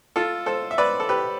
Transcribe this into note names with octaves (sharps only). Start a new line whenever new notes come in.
F4 A4
A4 C5
E5
B4 D5
A4
G4 B4